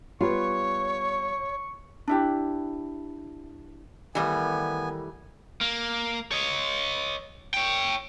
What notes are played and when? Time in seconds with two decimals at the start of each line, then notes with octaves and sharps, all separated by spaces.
0.21 G3 B3 F4 B4 C#5 C#6
2.07 D4 E4 G4
4.15 D#3 E3 G3 A3 B3 G#5
5.61 A#3
6.32 C#5 D#5
7.54 C#5 G5